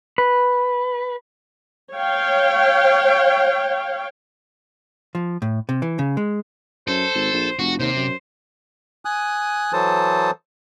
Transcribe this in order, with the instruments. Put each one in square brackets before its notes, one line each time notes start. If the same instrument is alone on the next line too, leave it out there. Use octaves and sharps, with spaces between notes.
[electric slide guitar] B4
[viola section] C#5 F5 G5
[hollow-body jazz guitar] F3
A2
C3
E3
C#3
G#3
[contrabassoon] F#2 [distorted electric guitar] A4 [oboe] C5
[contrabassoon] G#1
A#1
[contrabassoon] F1 [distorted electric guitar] F#4
[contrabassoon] D#2 [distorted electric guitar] C3 [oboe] C5
[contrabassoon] F#2
[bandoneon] G#5 D#6 F#6
E3 F#3 A4 C5 A5 D#6